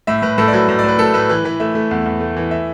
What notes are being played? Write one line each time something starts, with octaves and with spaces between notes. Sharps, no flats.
A2 E5
A2 B4
A2 A4
D5
F#3 B4
A2
D5
A2 B4
A3 A4
A2 B4
E3 B4
E3 B4
A3 E5
A3
E2
E2
A3
E3
E5